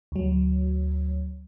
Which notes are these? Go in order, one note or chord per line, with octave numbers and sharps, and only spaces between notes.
D2 F#3